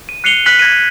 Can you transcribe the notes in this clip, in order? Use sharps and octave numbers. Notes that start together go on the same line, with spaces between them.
D#7
F#6 C7 C#7 D#7 F7 G7
F6 F#6 B6 F#7
F#6 G#6 A#6 D#7